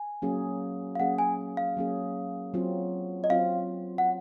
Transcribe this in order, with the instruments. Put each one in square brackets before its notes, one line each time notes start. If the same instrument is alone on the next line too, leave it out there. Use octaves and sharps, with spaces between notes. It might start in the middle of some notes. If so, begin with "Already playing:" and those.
Already playing: [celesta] G#5
[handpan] F#3 A#3 C#4 G#4
[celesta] F5
[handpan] F#3 A#3 C#4 G#4 [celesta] F#5
[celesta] G#5
F5
[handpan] F#3 A#3 C#4 G#4
F#3 C4 F4
[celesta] D#5
[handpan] F#3 C4 F4 [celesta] F5
[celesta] F#5